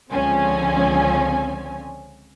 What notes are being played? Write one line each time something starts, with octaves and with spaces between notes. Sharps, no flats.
C#2 D3 F3 C4 C#4 G#5